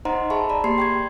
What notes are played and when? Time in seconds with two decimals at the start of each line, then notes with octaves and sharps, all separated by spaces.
0.05 D#4 C5 D#5 F#5 A#5 C6
0.30 G#4 E5 A5 B5 C#6
0.49 D5 A#5 B5
0.64 A#3 G4 C6 C7
0.78 G5 C#6 G#6